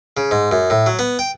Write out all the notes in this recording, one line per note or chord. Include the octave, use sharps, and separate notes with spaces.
C#3
G#2
F#2
A2
F#3
B3
G5